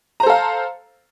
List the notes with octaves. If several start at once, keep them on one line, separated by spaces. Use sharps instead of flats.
A4 C5 F5 A#5